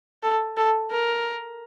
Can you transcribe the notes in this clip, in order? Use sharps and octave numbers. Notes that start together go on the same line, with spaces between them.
A4
A4
A#4